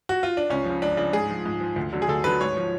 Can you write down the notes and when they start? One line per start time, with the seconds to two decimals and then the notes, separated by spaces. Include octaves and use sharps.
0.09 F#4
0.23 F4
0.37 D4
0.50 C#2 C#4
0.65 C#3 F3
0.82 C#2 D4
0.97 C#3 F3 D4
1.13 G#2 G#4
1.30 F3
1.45 G#2
1.61 F3
1.76 D2
1.93 D3 F#3
2.02 G#4
2.09 D2 A4
2.24 D3 F#3 B4
2.41 G#2 C#5
2.57 F3